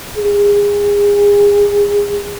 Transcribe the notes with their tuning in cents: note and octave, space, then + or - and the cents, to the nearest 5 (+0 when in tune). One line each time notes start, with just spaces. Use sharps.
G#4 -30